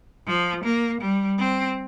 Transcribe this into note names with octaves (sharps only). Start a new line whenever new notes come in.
F3
A#3
G3
C4